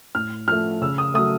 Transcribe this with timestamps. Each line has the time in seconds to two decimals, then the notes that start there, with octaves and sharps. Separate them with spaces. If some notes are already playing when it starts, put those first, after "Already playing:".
0.15 A2 F6
0.48 F3 A3 F6
0.81 C#3 E6
0.98 D#6
1.14 F#3 A3 D#6